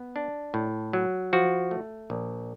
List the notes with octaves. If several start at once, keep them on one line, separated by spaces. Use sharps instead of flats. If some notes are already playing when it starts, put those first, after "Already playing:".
Already playing: B3
D4
A2
F#3
F3 F#4
A3
A#1